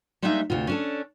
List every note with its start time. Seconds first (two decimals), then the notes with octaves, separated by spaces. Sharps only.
0.22 G3 G#3 A#3 D4 D#4 E5
0.50 D2 C3 F4
0.67 C#4 D4 A4